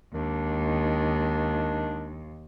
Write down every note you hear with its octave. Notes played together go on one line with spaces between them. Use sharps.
D#2 D#3 G#3 D4